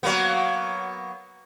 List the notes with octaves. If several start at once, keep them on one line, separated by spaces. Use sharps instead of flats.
F#3 A#3 B3